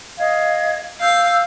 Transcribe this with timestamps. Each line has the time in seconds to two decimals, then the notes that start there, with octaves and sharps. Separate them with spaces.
0.19 D#5 F5 G#6
1.01 F5 E6 G6